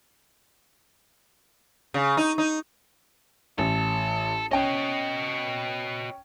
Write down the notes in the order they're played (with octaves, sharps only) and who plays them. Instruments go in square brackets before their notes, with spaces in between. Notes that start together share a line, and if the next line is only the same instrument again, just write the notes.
[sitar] C#3
D#4
D#4
[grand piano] A1 [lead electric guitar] A4
[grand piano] C#4 G5 [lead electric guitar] F#4 D#5